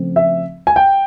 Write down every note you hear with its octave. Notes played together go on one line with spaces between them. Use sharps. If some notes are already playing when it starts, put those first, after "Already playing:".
Already playing: C#3 F3 A3 C4
E5
G#5
G5